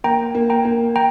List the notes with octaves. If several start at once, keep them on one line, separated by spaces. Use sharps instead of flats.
A#3 G5 A#5
A#3
G5 A#5
A#3
G5 A#5